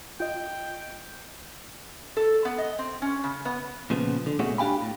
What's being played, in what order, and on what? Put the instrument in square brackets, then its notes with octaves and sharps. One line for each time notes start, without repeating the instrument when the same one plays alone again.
[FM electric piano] F4 D#5 [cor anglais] G5
[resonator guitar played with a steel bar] A4
B3
D#5
C4
C#4
C#3
B3
[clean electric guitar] A#2 C#3 F3 B3
D3
A#2 G#3 A3 B3 C#4 F#4
D4 G4 F5 G5 G#5 B5
A2